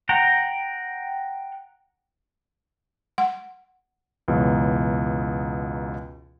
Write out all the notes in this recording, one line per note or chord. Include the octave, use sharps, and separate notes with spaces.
F#5 G5 A#5
F#5
C#2 F#2 B2 E3